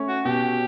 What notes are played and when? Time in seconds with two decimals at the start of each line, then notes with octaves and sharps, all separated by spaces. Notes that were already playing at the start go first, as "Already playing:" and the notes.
Already playing: A3 C#4
0.09 F#4
0.25 B2 G4